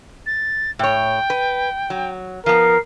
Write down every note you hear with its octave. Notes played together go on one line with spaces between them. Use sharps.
A6
A2 C#5 G5
B4
F#3
F3 B3 A#4 C7